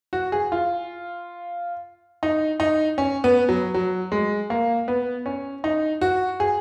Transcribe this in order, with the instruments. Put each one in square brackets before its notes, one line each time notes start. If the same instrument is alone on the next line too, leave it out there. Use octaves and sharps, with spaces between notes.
[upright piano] F#4
G#4
F4
D#4
D#4
C#4
B3
F#3
F#3
G#3
A#3
B3
C#4
D#4
F#4
G#4